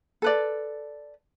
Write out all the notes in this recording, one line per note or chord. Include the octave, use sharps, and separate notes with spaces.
A4 B4 D5